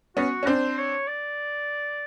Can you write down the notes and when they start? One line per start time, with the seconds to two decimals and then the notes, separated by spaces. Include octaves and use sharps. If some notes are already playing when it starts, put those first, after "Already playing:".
0.17 B3 C#4 F#4
0.43 C#4
0.47 C4 D4 C5
0.78 C#5
1.08 D5